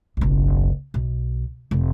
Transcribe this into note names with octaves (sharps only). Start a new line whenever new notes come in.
F#1 B1
B1
F1